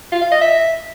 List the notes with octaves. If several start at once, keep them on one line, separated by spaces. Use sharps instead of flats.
F4
F5
D#5
E5